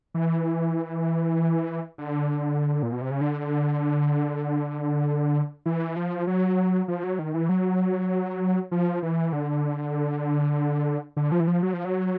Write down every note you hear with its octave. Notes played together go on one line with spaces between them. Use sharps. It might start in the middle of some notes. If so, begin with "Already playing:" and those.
E3
D3
A#2
B2
C3
C#3
D3
E3
F3
F#3
F3
F#3
D#3
E3
F#3
F3
E3
D3
D3
F3
E3
F3
F#3
F3
F#3